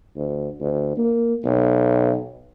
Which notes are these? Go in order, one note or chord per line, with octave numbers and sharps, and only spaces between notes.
D2
D2
A#3
B1